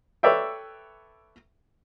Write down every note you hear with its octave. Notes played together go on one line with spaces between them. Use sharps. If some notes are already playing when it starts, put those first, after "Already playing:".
A4 B4 C#5 D5 E5 G5